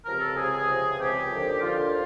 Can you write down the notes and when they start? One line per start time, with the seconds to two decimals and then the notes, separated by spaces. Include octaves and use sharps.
0.05 C#2 C3 F3 A#4
0.21 A4
0.37 C#2 C3 F3 G#4
0.68 C#2 C3 F3
0.99 C#2 C3 F3 G4
1.31 D#2 D3 F3
1.61 D#2 D3 F3 F4